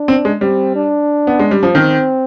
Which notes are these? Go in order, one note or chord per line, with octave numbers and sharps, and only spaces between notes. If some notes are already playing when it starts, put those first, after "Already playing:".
Already playing: D4
C4
G#3
G3 C4
D4
B3
G#3
G3
F3
D#3 C4